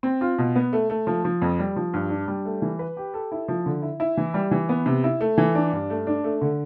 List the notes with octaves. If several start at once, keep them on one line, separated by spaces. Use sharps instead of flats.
C4
F4
B2
B3
A3
A3
F3
F3
F2
G3
F3
G2
D4
G3
A3
E3
B4
G4
A4
E4
F3
D3
E4
E4
E3
G3
E3
B3
C3
E4
A3
E3
D4
G2
A3
D4
A3
D3